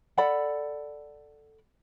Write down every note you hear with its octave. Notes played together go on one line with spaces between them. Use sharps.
A4 D5 F#5 B5